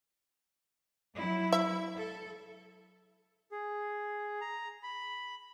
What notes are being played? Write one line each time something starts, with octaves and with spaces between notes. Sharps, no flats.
F#3 E4
E5
A4
G#4
A#5
B5